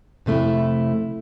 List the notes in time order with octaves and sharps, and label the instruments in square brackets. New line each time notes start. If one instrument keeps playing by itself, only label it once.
[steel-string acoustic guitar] F2 C3 A3 E4